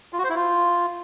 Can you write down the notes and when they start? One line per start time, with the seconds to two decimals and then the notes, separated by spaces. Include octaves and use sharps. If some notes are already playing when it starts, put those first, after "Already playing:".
0.13 F4
0.18 F#4
0.24 C5
0.30 E4
0.35 F4